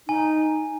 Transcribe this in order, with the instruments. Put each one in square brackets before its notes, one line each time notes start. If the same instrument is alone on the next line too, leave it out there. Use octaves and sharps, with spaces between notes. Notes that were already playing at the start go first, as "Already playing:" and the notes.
[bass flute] D#4 [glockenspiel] G#5